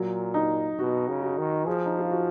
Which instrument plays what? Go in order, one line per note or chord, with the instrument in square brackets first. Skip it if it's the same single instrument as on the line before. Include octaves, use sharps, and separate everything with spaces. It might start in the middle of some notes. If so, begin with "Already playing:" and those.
Already playing: [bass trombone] A#2 [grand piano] F#3
[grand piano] D#4
[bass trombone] B2 [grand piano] F#4
[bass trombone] C#3
[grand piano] F#4
[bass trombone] D#3
[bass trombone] F3 [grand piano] G#4
[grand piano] D#4
F4
F#4